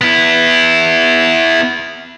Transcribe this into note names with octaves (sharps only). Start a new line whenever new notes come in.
B3 E4